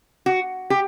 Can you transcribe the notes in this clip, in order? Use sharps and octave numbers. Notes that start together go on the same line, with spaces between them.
F#4
G4